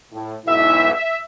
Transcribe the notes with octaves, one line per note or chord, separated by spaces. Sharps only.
A2
B1 G#2 E4 E5
E5